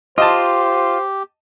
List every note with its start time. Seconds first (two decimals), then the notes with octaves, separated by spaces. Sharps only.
0.18 F4 G4 C5 D#5 A5